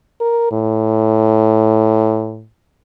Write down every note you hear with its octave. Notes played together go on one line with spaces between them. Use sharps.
A#4
A2